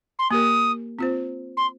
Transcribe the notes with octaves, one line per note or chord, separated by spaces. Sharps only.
C6
A#3 G4 A#4 D#6
C4 F4 C5
C6